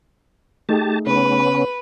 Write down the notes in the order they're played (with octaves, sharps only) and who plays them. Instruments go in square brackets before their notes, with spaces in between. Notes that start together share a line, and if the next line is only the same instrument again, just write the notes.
[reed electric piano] A3 D#4 G#4 [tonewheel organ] G4 A5
[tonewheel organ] C#3 B3 C#4 [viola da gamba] B4